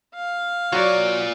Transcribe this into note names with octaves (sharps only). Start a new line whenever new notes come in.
F5
F#3 F4 F#4 C#5 D5